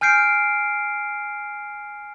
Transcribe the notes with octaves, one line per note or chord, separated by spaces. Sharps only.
G#5 F6 G6 C7 D7